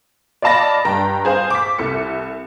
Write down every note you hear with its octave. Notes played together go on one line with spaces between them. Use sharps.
D5 D#5 F5 A5 B5 A#6
G2 G5 A#5
G#4 C5 F5
D6 B6
C2 A4 C#7